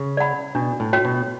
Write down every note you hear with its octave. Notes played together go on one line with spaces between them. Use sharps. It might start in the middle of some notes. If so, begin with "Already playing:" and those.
Already playing: C#3
D5 F#5 B5
B2 D4
A2
F#4 C#5 G5
B2